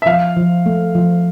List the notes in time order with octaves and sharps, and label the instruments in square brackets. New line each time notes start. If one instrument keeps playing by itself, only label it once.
[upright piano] E5
[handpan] F3 [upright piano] F5
[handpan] F3
A3
F3